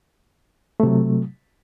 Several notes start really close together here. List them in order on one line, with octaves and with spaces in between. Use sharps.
A3 C3 F#3